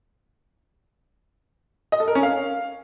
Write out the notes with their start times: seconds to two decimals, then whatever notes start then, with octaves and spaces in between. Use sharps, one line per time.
1.92 D#5
2.00 A4
2.08 A#4
2.15 C#4
2.23 F5